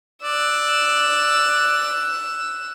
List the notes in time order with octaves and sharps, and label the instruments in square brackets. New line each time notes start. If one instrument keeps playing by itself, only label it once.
[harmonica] D5 [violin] E6 F#6